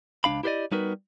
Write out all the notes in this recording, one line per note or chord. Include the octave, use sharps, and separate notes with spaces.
C#2 F3 D4 F5 B5
E4 G4 B4 C5 D5 D#5
G3 B3 D#4 F#4 A#4 B4